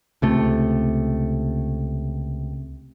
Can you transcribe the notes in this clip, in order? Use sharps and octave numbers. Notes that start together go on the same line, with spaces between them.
C#2 C3 A3